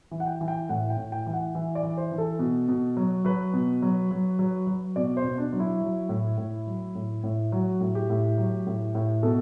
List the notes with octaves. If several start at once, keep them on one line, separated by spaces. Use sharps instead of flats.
E3
F#5
G5
E3
G5
A2 F#5
G5
A2
G5
E3
F#5
E3 E5
D5
E3
C5
E3
A4
B2
B2
F#3
F#3 B4
B2
F#3
F#3
F#3
F#3
B2 D5
C5
B2
D4
F#3
E4
F#3
A2
A2
F#3
A2
A2
F#3 F#4
A2
G4
A2
F#3
A2
A2
B2 A4